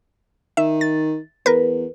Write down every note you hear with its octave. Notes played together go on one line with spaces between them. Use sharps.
D#3 E5
A6
E2 A#4 B4